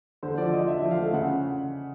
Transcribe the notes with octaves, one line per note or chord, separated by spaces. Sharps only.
D3 C5
F3 D5
F3 D#5
D4 E5
F3
F5
A3
C#3 F#5